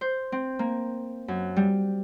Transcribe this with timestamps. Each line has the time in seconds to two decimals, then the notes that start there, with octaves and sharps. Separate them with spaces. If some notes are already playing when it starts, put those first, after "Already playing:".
0.01 C5
0.32 C4
0.59 A#3
1.28 F#2
1.56 G3